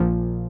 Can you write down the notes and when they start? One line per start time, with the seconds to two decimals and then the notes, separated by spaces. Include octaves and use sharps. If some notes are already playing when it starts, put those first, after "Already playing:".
Already playing: A#1 A#2 F3